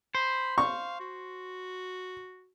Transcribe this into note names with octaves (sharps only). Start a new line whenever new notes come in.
C5 B5
F5 C#6
F#4